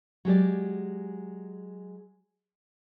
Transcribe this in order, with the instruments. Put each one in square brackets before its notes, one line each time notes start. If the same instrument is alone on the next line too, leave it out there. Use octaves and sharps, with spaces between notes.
[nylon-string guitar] F#3 G#3 G4 D5